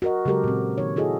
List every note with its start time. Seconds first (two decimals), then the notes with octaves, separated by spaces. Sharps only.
0.02 F#4 A#4 D#5
0.25 C#3 F#3 G#3 G4 A4 A#4
0.44 A#2 C4
0.78 D#3 D#4 C#5
0.96 E4 F#4 G#4 A4 D#5